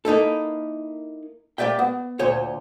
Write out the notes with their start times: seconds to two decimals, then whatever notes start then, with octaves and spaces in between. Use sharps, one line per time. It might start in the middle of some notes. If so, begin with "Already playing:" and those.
0.05 A#3 D#4 E4 A4
1.58 A#3 G4 D5 E5 G5
1.79 B3
2.19 D2 A#2 C5 C#5